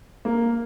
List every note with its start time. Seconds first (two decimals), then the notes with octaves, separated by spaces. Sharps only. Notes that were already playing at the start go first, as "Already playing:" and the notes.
0.25 A#3